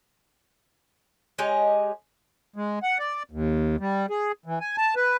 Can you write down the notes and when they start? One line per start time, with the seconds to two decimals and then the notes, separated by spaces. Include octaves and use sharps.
1.38 G#3 G4 C#5 D#5
2.56 G#3
2.83 F#5
2.99 D5
3.31 D#2
3.80 G3
4.10 G#4
4.46 E3
4.61 G#5
4.77 A5
4.96 B4